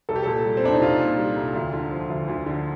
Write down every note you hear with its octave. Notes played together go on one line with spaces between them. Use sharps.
C2 A4
G4
A#2 A4
G3
C4
C2 D4
D#4
C2 F4
A#2
G3
C2
D2
D3
F3
D2
D2
D3